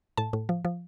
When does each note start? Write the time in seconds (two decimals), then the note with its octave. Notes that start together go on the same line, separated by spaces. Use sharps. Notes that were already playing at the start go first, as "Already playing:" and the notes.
0.17 A2 A5
0.33 A2
0.49 F3
0.65 F3